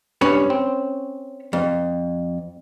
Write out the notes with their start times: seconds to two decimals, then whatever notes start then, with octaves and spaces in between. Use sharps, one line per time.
0.21 G2 C#4 C#5 B5
0.50 C4
1.53 F2